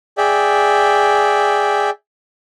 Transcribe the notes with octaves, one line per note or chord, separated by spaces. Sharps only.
G#4 D5 E5 G5